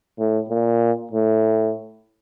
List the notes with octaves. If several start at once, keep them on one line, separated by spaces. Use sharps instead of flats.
A2
A#2
A2